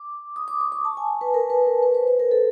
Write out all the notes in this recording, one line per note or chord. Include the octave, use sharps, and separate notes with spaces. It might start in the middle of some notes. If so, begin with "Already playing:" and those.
Already playing: D6
D#6
D6
C#6
C#6
A5
G#5
B4
A#4
B4
A#4
B4
C5
B4
A#4
A4